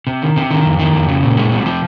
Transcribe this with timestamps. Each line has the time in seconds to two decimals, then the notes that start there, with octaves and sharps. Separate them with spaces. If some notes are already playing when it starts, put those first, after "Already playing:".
0.07 C3
0.22 D#3
0.36 C3
0.51 D#3
0.65 F2
0.79 D#3
0.93 F2
1.08 C#3
1.23 A#2
1.37 G#3
1.52 C3
1.66 F3